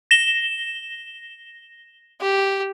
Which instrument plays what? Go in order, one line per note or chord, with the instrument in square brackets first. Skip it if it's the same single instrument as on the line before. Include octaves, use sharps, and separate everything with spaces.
[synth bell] A#6 E7 G7
[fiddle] G4